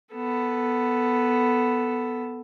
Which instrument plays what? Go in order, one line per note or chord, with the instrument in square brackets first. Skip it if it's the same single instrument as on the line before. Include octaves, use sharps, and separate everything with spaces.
[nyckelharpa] B3 A4